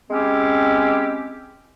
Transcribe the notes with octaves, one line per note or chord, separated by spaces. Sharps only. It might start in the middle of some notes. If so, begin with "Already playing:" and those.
G#3 C4 C#4 E4 G4